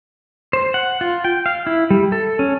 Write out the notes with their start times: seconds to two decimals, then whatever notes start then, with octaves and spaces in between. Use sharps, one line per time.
0.53 C5
0.74 F#5
1.01 F4
1.24 G5
1.46 F5
1.67 E4
1.91 G3
2.12 A4
2.39 C#4